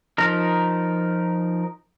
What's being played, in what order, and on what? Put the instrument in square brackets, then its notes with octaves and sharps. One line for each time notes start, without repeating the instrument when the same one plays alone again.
[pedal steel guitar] F3 D#4 A#4